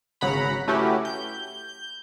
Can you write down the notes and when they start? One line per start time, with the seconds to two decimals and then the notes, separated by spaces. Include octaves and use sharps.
0.21 G#1 C#3 F#3 F#5 A#5 B5
0.67 A3 C#4 E4 F#4 G4 B4
1.05 G6